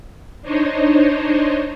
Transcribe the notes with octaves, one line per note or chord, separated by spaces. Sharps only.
D4 D#4 C5 C#5 D#5